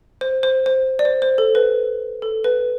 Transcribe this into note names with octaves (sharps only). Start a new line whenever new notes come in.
C5
C5
C5
D5
C5
C5
A4
B4
A4
B4